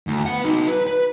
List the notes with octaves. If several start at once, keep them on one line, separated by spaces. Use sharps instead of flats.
D2
B3 F#5
D#4 F#4
B4
B4